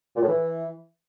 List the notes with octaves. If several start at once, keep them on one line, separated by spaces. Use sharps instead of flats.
A#2
A2
E3